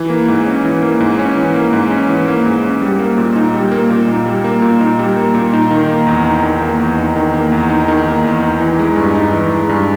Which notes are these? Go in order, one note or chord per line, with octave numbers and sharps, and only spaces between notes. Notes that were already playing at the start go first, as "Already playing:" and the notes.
Already playing: E3
A#3
G#2
C#4
E3
A#3
G#2
C#4
E3
A#3
G#2
C#4
E3
A#3
G#2
C#4
G3
A#3
A#2
D#4
G3
A#3
A#2
D#4
G3
A#3
A#2
D#4
G3
A#3
A#2
D#4
D#3
A#3
E2
D#4
D#3
A#3
E2
D#4
D#3
A#3
E2
D#4
D#3
A#3
E2
D#4
E3
G#3
G2
D#4
E3
G#3
G2